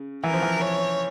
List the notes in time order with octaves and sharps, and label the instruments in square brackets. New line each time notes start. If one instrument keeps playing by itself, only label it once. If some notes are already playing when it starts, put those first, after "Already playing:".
Already playing: [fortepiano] C#3
[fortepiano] E3 [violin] A#4
[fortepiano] F3
E3
[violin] C#5